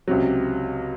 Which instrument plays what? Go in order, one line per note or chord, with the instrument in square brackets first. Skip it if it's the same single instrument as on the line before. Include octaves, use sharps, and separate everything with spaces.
[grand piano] C#2 C3 F#3